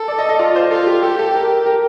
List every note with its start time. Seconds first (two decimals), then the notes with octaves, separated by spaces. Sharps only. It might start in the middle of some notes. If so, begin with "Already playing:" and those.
Already playing: A4
0.08 D5
0.18 D#5
0.29 D#5
0.39 F4 D5
0.56 C5
0.71 F4 A4
0.87 G4
1.03 G4 A4
1.19 A4
1.35 A#4
1.66 A#4